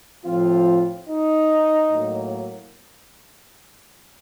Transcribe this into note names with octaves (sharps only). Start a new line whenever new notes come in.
A2 F3 C4 F4
D#4
A2 F#3 A#3